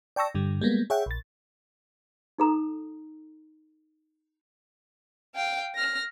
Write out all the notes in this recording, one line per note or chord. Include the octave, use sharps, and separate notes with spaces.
D5 G5 A5 C#6 E6 A#6
G2 D3 G3
G3 G#3 A#3 B3
G#4 C#5 E5 F#5 G5
A#1 A6
D#4 A4 A#5 D#6
F5 G5
F6 A#6